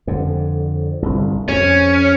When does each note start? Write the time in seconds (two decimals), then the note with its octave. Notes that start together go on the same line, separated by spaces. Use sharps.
0.07 F2 D3
1.02 G1 C2
1.49 F2 C#4